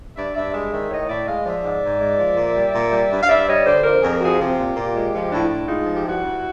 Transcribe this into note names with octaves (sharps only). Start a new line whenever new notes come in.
G2 D5 E5
G2 D5 E5
G#3 D5 E5
D#3 D5 E5
A2 C#5 D#5
A2 D5 E5
G#3 D#5 F5
F3 D5 E5
G#2
G#2
G#3
F3
A#2
G3
A#2
G3
G2
F5
G2 D5 E5
G3 C#5 D#5
D3 C5 D5
F2 A#4 C5
F2 G#4 A#4
F3 F#4 G#4
C3 F4 G4
A#2
A#2
G#3
F3
A2 D4 E4
A2
G#3 D#4 F4
F3
G4
G2 E4 F#4
G2